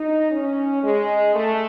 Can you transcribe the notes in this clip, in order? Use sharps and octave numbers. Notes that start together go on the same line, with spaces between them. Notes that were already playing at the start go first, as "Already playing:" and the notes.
Already playing: D#4
C#4
G#3
A3